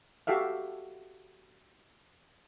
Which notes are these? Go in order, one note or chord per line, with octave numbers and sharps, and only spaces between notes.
F#4 G4 A4 E5 F5